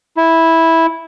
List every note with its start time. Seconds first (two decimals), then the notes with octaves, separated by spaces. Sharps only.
0.17 E4